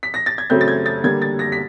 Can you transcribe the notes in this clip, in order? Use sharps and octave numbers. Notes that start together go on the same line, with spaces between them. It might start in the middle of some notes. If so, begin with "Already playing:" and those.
B6
A#6
A6
G#6
C#3 F#3 A3 C4 G6
A6
G#6
A6
D3 G3 A#3 G#6
A6
A#6
B6